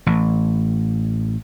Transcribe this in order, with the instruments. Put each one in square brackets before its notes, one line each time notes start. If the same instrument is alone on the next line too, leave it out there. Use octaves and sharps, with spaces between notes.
[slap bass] A1